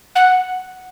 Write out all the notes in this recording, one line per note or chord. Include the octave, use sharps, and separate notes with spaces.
F#5